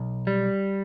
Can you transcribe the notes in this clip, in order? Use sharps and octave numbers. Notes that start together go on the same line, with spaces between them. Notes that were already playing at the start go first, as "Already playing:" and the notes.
Already playing: B1
G3